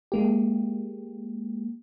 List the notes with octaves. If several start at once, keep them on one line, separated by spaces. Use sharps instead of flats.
G#3 A#3 G4